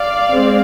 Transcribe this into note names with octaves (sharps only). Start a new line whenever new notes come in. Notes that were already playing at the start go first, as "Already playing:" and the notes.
Already playing: D5 F5
G#3 C4